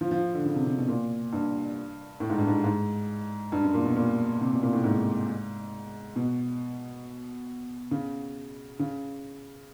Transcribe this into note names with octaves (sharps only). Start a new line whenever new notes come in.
F3
F3
D3
C#3
C3
C3
B2
A#2
G2
A2
G#2
G2
G#2
G#2
G2
F#2
A#2
B2
A#2
C3
B2
A#2
A2
G#2
B2
C#3
C#3